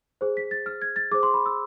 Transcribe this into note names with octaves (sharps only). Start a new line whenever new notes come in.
G#4 C5
B6
A6
F6
G#6
A6
G#4 C5 D6
C6
B5
E6